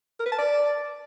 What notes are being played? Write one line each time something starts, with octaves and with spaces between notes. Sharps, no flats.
A#4
B4
A5
D5